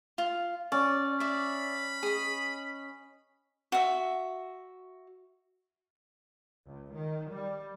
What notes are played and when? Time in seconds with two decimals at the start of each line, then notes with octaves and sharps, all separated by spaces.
0.18 F4
0.72 C#4 D5
1.20 D5 E5 B5
2.03 G#4 D#5
3.72 F#4 E5
6.64 C#2
6.93 D#3
7.29 G3